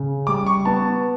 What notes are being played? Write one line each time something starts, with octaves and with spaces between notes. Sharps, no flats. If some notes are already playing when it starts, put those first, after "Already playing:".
Already playing: C#3
G3 D6
C#6
B3 A5